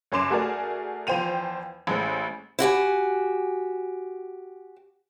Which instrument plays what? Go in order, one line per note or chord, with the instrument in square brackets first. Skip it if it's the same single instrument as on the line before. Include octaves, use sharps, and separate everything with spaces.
[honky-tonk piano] F#1 F#2 C#4 C6 D6 E7
A3 F#4 G#4 A#4 D5
E2 F3 C5 G5 D#7 F7
A1 G#3 C5
[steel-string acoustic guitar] E4 F#4 G4 G#5